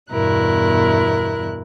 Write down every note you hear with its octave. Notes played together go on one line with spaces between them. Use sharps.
E2 G2 B2 E4 A#4 F#6